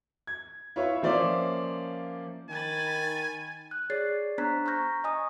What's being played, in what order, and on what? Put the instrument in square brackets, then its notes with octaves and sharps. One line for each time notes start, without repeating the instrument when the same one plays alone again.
[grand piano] G#6
E4 F4 B4 C#5
F3 A#3 C#4 C5 D5 E5
[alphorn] D#3 [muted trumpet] G#5 [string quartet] B5 A6
[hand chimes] F#6
G#4 C#5 D5 A6 C7
B3 D4 C5 A#5 F#6 B6
A#5 C#6 F6 G6 A#6
D#5 G#5 C#6 D#6